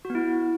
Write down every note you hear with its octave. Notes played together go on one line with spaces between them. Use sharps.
F#4
B3
E4